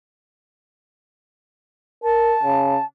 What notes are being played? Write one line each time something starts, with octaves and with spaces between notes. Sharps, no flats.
A#4 A5
C#3